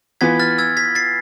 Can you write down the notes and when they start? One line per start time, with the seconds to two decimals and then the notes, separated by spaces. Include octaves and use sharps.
0.21 E3 B3 F4 G#6 B6
0.40 F6 A6
0.58 E6 G#6
0.77 G#6 B6
0.95 A6 C7